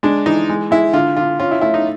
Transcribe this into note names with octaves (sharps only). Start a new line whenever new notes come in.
G#3 D4
E3 D#4
G#3
G#3 E4
D3 F4
D3 F4
C#4 F4
E4
A3 E4
D#4